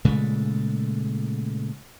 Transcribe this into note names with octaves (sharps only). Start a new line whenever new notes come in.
A#2 C#3 G#3 A3